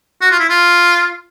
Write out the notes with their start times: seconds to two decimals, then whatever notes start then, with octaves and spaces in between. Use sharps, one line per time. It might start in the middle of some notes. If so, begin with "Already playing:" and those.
0.21 F#4
0.31 F4
0.40 E4
0.50 F4